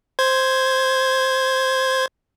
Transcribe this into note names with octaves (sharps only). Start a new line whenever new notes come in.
C5 G#6